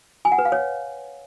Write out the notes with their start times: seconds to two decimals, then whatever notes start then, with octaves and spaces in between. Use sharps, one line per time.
0.25 G#5
0.32 F#5
0.39 B4
0.45 F5
0.52 C#5